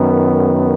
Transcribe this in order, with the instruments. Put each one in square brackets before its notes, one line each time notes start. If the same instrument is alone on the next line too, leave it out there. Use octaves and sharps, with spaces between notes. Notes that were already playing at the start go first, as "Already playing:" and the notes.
Already playing: [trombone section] F#2 D#3 B3